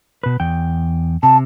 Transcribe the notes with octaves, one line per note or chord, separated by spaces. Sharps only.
B2 B4
E2 G5
C3 A5